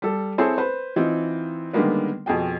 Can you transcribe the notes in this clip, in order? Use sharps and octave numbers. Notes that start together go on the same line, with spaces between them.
G3 A4
C4 E4 G#4 A4 C5 C#5
B4 C5
E3 C4 D#4 F4
D3 D#3 G3 G#3 A#3 B3
F2 B2 G#4 G5